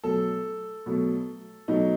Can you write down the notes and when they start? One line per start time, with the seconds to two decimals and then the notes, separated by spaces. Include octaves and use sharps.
0.04 B2 F#3 A3 A4
0.86 B2 F#3 A3
1.68 B2 F#3 A3 D#4